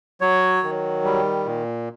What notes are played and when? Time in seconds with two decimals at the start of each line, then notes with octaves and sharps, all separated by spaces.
0.21 F#3 C#5
0.63 D#3
1.04 G3
1.46 A#2